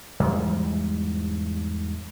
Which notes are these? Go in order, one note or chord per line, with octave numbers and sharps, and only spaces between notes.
E2 G#2 G3